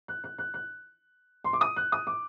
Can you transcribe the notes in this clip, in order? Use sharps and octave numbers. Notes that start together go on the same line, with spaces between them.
F#6
F#6
F#6
F#6
C6
D6
D#6
F#6
D#6
D6